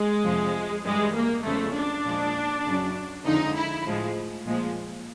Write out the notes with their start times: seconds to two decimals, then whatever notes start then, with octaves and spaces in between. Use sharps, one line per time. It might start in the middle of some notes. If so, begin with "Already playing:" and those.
Already playing: G#3
0.24 F2 C3 F3
0.84 G2 E3 G3 G#3
1.15 A#3
1.44 E2 C#3 F3 G#3 A3
1.75 D4
2.04 A#2 F3 G#3
2.65 F#2 C#3 F#3
3.25 F2 D3 F3 G#3 D#4
3.56 E4
3.85 A2 F3 G#3
4.45 A#2 F3 G#3